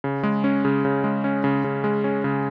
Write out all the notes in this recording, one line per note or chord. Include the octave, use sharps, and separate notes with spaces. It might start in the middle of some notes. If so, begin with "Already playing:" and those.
C#3
G#3
C#4
C#3
C#3
G#3
C#4
C#3
C#3
G#3
C#4
C#3